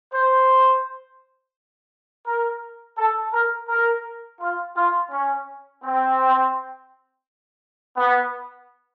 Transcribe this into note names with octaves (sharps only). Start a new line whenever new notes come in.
C5
A#4
A4
A#4
A#4
F4
F4
C#4
C4
B3